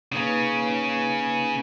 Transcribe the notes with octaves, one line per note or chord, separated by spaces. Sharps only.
C#3 A#3 C#4 D#4 B4